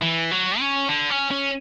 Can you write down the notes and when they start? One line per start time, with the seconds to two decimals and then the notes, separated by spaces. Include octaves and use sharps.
0.02 E3
0.31 F#3
0.59 C#4
0.89 D3
1.11 C#4
1.31 C#4